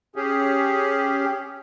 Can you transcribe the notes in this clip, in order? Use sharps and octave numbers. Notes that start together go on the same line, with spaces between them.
C#4 G4 G#4